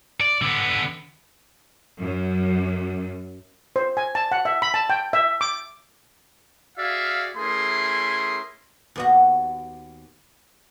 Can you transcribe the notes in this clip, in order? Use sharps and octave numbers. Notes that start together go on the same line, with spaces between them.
D5
D3 B3
F#2
C5
G#5
A5
F#5
E5
B5
A5
G5
E5
D6
F#4 G#4 D5 E5 F5
A3 C#4 E4 G#4 A#4 C6
D#2 B3 F#4